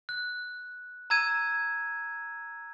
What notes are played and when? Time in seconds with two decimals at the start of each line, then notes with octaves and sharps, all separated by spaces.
0.09 F#6
1.10 A#5 E6 G#6 D#7 E7